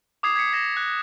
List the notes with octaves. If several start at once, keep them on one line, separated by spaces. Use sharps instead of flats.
D6 D#6 G#6 C7
G#6 B6 C#7
G#6 A#6 E7
F#6 A#6